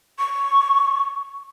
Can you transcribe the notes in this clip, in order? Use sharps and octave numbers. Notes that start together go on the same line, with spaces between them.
C#6